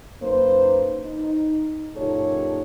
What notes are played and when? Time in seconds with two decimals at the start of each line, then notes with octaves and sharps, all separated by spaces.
0.22 F#2 A#3 D#4 B4 C5
1.04 D#4
1.97 F#2 A#2 D#4 G4 A4 C#5